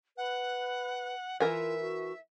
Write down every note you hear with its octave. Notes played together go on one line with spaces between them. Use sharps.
B4 F#5
E3 F4 A#4 E5 G#5
F#4